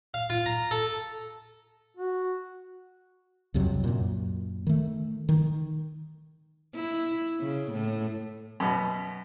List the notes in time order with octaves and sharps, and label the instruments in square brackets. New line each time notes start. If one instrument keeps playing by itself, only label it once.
[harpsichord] F5
F4
A#5
A4
[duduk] F#4
[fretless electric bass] C2 F2 C3 F#3
F#2 A#2
D#3 A3
D#3
[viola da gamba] E4
C#3
A2
[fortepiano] F#2 B2